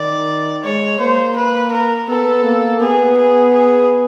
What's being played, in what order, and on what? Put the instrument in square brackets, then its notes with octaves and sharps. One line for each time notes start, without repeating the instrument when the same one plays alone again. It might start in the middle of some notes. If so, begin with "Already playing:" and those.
Already playing: [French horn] D#3 [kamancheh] D5
[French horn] G#3 [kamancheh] C#5
[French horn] A#3 [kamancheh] C5
[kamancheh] B4
A#4
[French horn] B3 [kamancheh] A4
[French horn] A#3
[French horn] B3 [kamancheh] G#4
[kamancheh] G#4
G#4